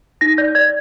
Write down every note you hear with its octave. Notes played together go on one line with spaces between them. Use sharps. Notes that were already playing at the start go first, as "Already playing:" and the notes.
D#4 A#6
D5 G6
D5 G#6